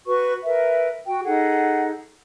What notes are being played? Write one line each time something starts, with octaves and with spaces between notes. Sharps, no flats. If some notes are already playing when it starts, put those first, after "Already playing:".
F#4 B4 C#6
A#4 B4 E5
F#4 G5
D#4 G#4 A4 F#5